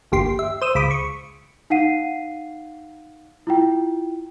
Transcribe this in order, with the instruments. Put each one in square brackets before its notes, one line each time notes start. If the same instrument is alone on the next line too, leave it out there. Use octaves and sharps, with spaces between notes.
[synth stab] G1 D#2 G4 C6
E5
C5 D#6 E6
C#2 B5 D6 D#6
C#6
[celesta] D#4 F5 F#5 C7 D#7
E4 F4 G5